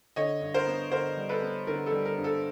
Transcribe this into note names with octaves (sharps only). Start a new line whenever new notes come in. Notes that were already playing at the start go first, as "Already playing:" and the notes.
D3 C#5 D#5
G2
A#4 C5
B3
D3 A#4 C5
G3
A4 B4
B3
D3 A#4
A4
G3
A#4
G2
A4